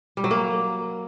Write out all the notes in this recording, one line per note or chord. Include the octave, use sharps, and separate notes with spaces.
G3
F#3
A#3